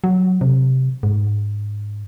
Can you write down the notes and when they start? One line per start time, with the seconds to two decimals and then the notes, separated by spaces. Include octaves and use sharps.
0.04 F#3
0.41 C3
1.03 G#2